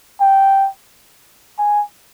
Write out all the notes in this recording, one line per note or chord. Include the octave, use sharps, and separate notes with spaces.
G5
G#5